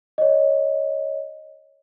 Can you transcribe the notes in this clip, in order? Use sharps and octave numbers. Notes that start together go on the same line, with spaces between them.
C#5 D#5